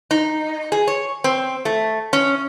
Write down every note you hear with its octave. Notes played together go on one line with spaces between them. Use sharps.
D#4
G#4
C#5
C4
A3
C#4